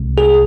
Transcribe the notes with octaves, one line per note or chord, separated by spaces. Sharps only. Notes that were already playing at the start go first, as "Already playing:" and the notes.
Already playing: C2 C3 G#3
G#4